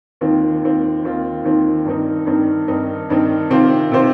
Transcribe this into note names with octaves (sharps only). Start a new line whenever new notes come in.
D#2 D#3 C4 F4
D#2 D#3 C4 F4
D#2 D#3 C4 F4
D#2 D#3 C4 F4
G2 D#3 C4 D#4
G2 D#3 C4 D#4
G2 D#3 C4 D#4
G2 D#3 C4 D#4
C3 D#3 C4 F4 C5
C3 D#3 C4 F4 C5